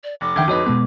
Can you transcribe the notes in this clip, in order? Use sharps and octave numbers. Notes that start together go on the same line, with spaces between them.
D5
F1 D6
D2 D#3 E5 G5 G#6
F2 G#2 F#4 B4 C#5 D#5
B2 G#3 B3